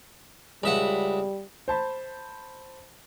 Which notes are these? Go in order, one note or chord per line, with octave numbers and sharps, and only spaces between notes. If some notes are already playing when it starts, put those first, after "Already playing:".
C#2 G3 E5 F#5
C5 A5 B5